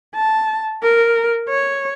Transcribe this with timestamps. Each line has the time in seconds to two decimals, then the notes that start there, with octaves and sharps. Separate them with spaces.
0.15 A5
0.83 A#4
1.49 C#5